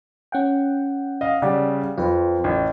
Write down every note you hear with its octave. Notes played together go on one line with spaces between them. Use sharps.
C#4 F#5 G5
D#5 F5
C#3 G3 D5 F#5
F2 F4 B4 C5
A1